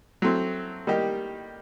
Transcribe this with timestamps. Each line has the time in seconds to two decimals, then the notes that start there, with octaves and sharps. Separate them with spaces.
0.22 F#3 A3 C4
0.87 D#3 G3 A#3 D#4 G4